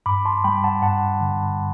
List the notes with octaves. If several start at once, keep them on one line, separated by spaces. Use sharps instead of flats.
G2 B5 D6
A5 C6
G3 G5 B5
F#5 A5
G2 F#5 A5
D3